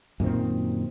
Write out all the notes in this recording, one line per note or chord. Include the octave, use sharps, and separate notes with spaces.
F#2 A#2 D#3 C4